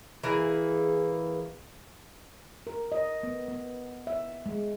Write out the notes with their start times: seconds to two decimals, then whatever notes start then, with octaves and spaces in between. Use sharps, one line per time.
0.23 E3 A#3 G#4
2.67 A#4
2.92 D#5
3.23 B3
3.48 B3
4.07 E5
4.46 G#3